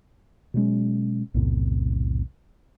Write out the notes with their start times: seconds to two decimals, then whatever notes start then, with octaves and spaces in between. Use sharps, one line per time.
0.54 B2 F#3 G#3 C#4
1.34 B1 E2 A2 C3